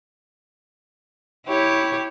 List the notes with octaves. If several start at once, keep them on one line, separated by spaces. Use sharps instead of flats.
E4 G4 C#5